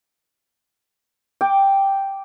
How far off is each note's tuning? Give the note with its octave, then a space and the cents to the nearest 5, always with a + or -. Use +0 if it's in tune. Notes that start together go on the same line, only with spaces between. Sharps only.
G5 +0 D6 +0